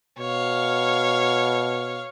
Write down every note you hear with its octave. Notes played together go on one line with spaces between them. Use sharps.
B2 C#5 F5